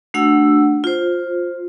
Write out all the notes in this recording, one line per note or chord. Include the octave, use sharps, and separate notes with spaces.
A3 D4 F#4 F#5 E6
F4 C5